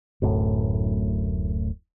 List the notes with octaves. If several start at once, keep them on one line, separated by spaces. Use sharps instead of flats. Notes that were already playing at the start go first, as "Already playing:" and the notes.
D1 F#2 A2